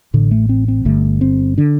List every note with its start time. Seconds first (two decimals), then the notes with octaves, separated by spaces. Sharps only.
0.14 A1 A2 D3
0.31 A3
0.49 C4
0.68 C4
0.85 G1 G2 D3 A3
1.21 C4
1.58 D3 D4